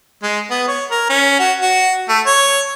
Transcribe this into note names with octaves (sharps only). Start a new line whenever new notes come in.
G#3
B3
C#5
A#4
C#4
F#4
F#4
A3
C#5